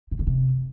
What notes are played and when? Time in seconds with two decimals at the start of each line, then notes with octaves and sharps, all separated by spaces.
0.11 A2
0.19 C#3
0.27 C3